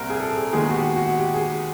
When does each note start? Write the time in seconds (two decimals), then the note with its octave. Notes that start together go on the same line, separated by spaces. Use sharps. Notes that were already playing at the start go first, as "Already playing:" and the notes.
Already playing: C2 A#2 G3 C4 A#4
0.10 G#4
0.20 A4
0.37 G#4
0.53 D#2 D#3 G#3 B3 G#4
0.70 F#4
0.74 G4
0.96 F#4
1.18 G4
1.34 G#4